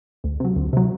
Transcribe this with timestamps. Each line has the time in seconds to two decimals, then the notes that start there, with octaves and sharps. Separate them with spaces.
0.24 D2
0.40 C3 F#3
0.56 D2
0.73 C3 F#3